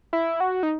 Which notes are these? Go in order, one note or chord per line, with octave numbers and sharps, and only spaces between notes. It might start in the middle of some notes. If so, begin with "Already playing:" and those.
E4
F#4
D#4